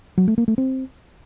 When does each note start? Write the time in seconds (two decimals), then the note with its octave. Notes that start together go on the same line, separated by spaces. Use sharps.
0.18 F#3
0.28 A3
0.38 A#3
0.48 A3
0.58 C4